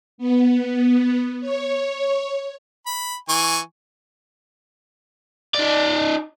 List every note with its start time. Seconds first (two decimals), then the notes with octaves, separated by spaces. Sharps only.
0.18 B3
1.41 C#5
2.86 B5
3.29 E3 G#5 C#6
5.55 D#4 D5